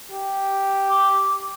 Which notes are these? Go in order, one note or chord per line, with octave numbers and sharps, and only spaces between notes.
G4
D6